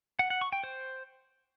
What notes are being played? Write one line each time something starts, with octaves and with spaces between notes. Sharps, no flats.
F#5
F#5
C#6
G5
C5